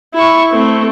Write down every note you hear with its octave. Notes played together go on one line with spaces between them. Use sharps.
E4 C#6
A3 C4